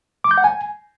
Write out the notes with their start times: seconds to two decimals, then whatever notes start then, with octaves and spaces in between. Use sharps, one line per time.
0.24 D6
0.31 G6
0.38 F#5
0.44 G#5